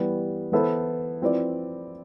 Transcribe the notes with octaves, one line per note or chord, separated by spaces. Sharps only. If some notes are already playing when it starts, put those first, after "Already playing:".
Already playing: E3 G3 B3
E3 B3 E4 A4 C5
F3 C4 E4 B4 D5